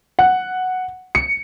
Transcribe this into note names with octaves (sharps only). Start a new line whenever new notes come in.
F#5
C#7